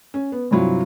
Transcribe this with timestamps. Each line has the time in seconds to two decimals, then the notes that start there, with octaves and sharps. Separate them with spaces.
0.14 C#4
0.32 B3
0.51 G2 C3 F#3 E4 F4